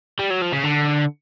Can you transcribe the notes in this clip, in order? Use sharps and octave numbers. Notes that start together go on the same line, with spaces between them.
G3
F#3
F3
C#3
D3